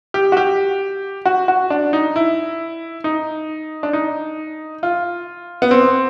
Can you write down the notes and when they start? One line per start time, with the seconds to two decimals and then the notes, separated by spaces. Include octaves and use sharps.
0.14 G4
0.32 F#4
0.37 G4
1.26 F#4
1.48 F#4
1.70 D4
1.93 D#4
2.16 E4
3.04 D#4
3.83 D4
3.93 D#4
4.83 F4
5.62 B3
5.71 C4